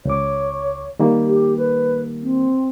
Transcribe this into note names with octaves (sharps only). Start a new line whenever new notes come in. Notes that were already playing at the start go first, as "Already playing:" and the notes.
C#2 C#5 D6
D#3 G3 A#3
G4
B4
C4